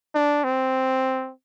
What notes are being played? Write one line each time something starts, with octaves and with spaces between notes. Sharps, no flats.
D4
C4